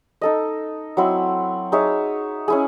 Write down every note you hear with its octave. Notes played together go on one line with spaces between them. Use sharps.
D#4 A4 D#5
F#3 C4 E4
D#4 G#4 C#5 E5
C#4 E4 G#4